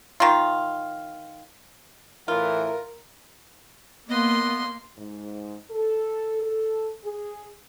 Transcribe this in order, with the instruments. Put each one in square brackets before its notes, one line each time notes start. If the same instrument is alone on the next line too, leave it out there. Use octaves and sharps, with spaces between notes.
[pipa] D#3 F4
[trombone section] A2 E3 E4 [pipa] F4 [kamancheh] A#4
[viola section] A#3 [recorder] B3 [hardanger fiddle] D#5 C6
[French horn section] G#2
A4
A4
G#4